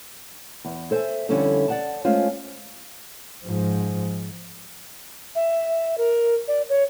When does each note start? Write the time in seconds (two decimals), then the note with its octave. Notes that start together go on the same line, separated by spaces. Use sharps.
0.65 E2
0.91 A4 C5 E5 G#5
1.29 F2 D3 G3 C#4 E4 A4
1.68 D5 F#5 A5
2.04 G#3 A3 C#4 F4 C5
3.44 G#2 F3
5.35 E5
5.98 A#4
6.48 D5
6.69 C#5